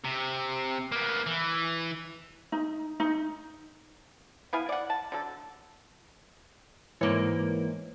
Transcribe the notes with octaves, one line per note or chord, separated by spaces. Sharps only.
C3
A#3 B3
E3
D#4
D#4
B3 E4 F5 G#5
D5 F#5
A5
D3 F#3 A4
G#2 E3 A#3 C#5